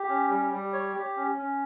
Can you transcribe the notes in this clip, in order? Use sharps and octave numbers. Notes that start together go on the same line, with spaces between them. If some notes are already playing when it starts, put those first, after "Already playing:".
Already playing: G4
C#4
G3
G3
C#5
G4
C#4
C#4